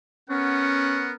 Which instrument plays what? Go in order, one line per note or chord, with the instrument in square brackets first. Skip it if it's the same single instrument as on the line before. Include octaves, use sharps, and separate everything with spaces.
[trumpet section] B3 A#4 F#5 [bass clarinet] C#4